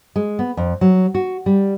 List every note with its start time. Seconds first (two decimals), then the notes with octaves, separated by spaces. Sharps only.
0.16 G#3
0.39 B3
0.57 F2
0.81 F#3
1.15 F#4
1.46 G3